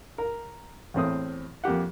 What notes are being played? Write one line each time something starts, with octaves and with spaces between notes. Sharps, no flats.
A#4
E2 A2 C4 D#6
F2 A#3 G4 F#5